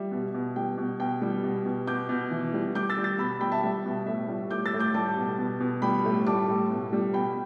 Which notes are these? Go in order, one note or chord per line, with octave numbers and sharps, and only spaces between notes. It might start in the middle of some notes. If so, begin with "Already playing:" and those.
Already playing: G3 E5
B2
B2
G3 G5
B2
B2 G5
G3
B2
B2
B2 D6 G6
B2
E3
G3
G3 D6 G6
E6 A6
G3
E6 A6
B2 B5 E6
G3 G5 B5
E5 A5
G3 E5
B2
A2 E5
G3
A2 D6 G6
E6 A6
A2
D6 G6
G3 A5 D6
B2
B2
B2
G3 G5 B5
A2
G3 A5 D6
A2
B2
G3
B2 G5 B5